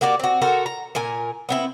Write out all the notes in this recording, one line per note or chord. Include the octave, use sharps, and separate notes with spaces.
A#3 F#4 G4 D5
C4 F#4
F#4 A4 A#4 C5
A#5
A#2 A#4 G#5
B3 C4 E4